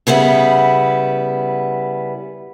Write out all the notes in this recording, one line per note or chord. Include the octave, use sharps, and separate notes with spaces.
C#3 G3 B3 E4